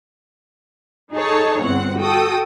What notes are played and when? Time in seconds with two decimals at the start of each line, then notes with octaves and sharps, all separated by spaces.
1.13 D#4 G#4 A4 C#5 A5
1.63 G1 E2 C4 F#5
1.99 F#4 A4 G5 D#6